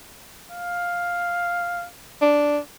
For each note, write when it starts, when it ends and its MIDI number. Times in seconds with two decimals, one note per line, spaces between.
0.51 1.88 77
2.22 2.58 62